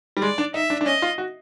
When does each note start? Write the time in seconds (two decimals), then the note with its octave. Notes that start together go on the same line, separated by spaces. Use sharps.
0.17 G3
0.22 G#3 D5
0.38 D4
0.54 D#4 E5
0.70 D4
0.81 D4
0.86 C#4 D#5
1.02 F4
1.18 F#4